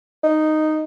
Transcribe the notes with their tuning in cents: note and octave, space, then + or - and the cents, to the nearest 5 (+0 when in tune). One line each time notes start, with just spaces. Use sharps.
D#4 -5